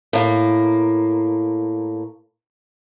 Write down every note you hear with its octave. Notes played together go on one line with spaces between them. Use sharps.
A2 A#3